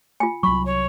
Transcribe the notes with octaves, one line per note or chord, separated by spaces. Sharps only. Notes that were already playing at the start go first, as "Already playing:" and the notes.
F4 G#5
C2 F#3 B5 C#6
C#5